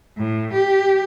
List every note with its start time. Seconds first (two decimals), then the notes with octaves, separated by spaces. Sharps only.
0.18 A2
0.53 G4